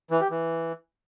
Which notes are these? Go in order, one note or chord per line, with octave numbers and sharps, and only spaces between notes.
E3
G4
E3